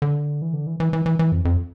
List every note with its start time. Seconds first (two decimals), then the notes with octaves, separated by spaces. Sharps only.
0.02 D3
0.42 E3
0.53 D3
0.67 E3
0.80 E3
0.93 E3
1.06 E3
1.19 E3
1.32 F2
1.45 F2